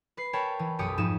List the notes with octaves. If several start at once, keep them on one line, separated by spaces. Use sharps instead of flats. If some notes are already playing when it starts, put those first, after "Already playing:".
B4 C7
A#4 C#5 G5 A5 B5
E3
B1 F#2 G4 D#6 B6 C#7
F2 G#2 F3 D#4 E7